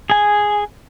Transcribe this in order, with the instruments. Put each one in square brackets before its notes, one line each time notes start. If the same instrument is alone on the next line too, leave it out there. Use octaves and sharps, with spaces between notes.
[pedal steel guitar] G#4 G#5